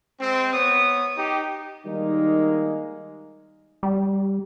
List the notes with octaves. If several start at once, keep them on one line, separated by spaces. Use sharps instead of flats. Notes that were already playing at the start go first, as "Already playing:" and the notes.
G#3 C4
B3 C#5 D#6
D#4 G4
D#3 G3 G#3 A#3 D#4
G3